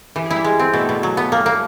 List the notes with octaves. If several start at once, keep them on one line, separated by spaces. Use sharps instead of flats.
E3 G4
E4 G#4
G3 G4
G#3
C4
B2 A3 A4
B2
F#3
B3
A#3
A#3